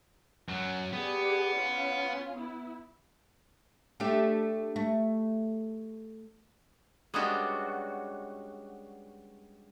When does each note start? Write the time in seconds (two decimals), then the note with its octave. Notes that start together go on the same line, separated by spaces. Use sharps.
0.49 F#2 F#3
0.93 B3 G4 G#4 D5
1.56 C#4 F4
2.37 B3 E4
4.00 A3 D4 G4
4.76 A3
7.14 G3 G#3 B3 C#4 D4 F#4